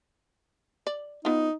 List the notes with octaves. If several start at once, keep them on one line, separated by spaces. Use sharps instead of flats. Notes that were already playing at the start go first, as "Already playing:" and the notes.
D5
B3 D#4 F4